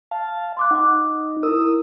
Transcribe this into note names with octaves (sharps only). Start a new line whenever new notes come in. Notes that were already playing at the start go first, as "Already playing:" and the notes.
F5 A5
C6 D6 F#6
D#4 F#5 D6
E4 A#4 D#6 E6